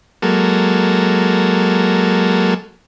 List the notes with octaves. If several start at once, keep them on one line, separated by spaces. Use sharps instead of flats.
F#3 G#3 A#3 A4